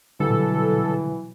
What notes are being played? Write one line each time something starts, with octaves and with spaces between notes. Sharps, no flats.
B2 D3 E3 F#3 G3 A4